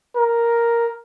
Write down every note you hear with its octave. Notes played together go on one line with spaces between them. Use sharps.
A#4